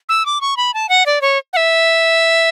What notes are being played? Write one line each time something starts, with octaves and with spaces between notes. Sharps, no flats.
E6
D6
C#6
B5
A5
F#5
D5
C#5
F#5
E5